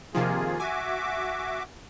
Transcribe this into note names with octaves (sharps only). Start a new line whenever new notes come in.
C3 D#3 F3 A#3 F4 G#4
F#4 E5 G#5 D6